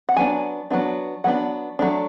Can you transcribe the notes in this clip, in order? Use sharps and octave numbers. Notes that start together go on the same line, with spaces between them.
F#5
F#3 B3 D4 G#5
F#3 B3 D4
F#3 B3 D4 F#5
F#3 A3 D4